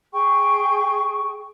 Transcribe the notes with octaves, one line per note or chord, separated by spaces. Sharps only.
G#4 G5 C#6